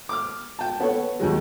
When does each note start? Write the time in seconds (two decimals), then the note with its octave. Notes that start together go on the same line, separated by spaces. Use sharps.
0.09 D6 F6
0.59 G5 A5
0.80 B3 A4 C#5
1.20 D#2 D#3 F#3 G#3